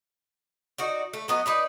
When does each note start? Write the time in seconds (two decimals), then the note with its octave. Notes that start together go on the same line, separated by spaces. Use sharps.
0.78 D#4 F#4 D5
1.13 A3
1.28 F#3 B3 D#5
1.46 D#4 B4 D5